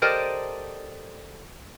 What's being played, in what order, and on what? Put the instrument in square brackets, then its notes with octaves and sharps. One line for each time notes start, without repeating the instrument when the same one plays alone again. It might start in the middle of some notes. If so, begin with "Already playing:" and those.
[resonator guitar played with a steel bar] G4 A4 A#4 C5 D5 D#5